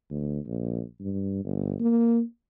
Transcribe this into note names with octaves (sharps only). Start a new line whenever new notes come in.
D2
A#1
G2
G1
A#3